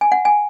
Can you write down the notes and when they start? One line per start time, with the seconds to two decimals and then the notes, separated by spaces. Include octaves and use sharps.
0.01 G#5
0.12 F#5
0.25 G#5